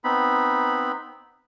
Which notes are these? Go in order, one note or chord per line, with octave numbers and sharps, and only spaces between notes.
B3 C4 D#4 B5